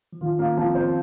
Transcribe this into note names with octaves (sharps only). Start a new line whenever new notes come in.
F3
D#3 F4
A#3 C#4
F3 C4
C4 C5